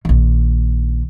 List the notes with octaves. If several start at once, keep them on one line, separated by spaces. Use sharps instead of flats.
A#1 D#3